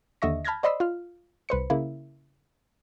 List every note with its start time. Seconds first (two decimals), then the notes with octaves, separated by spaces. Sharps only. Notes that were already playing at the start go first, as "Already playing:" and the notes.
0.22 D#2 D3 D#5 E5 C#6 A#6
0.45 A5 B5 F6 G6 G#6 A#6
0.63 C5 D5 D#5 B5 C6 E6
0.80 F4 F6
1.49 C2 B4 C5 C#7
1.70 C#3 A#3 E4